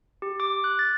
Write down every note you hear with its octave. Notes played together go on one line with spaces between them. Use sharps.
G4
D6
F#6
A6